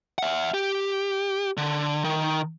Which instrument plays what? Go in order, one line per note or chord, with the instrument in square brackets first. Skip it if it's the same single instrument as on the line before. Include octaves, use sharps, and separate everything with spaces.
[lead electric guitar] E5 F#5
G4
D3
D#3